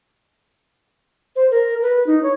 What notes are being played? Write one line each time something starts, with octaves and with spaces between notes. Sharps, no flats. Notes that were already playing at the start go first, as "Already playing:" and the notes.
C5
A#4
B4
D#4
C#5